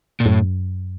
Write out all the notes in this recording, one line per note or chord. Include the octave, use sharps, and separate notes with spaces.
A#2
F#2 A2